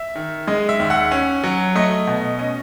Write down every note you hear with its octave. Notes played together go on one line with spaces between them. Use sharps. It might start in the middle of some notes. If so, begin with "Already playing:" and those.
Already playing: E5
D#3
G#3 D#5
E5
D#2
F#5
C#4
F#3
A3 D#5
B2
C#4 D#5